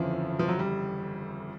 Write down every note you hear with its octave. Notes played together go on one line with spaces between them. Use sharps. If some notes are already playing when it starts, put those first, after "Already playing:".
Already playing: G1 F2 C#3 E3 F3
F3
F#3
G3